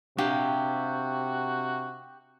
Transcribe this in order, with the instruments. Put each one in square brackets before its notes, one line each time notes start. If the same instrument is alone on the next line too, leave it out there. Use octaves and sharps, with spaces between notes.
[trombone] C3 [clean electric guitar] D4 C5 F5 [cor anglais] F#4 [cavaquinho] G4